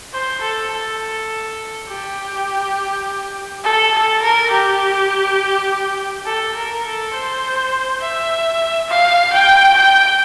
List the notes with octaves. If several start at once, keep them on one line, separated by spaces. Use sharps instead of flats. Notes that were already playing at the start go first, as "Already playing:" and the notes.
C5
A4
A4
G4
A4
A4
A#4
G4
A4
A#4
A4
C5
E5
F5
G5
G5